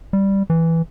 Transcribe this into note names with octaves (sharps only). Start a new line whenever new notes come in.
G3
E3